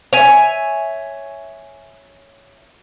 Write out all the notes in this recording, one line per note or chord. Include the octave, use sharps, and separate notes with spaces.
C#5 E5 G#5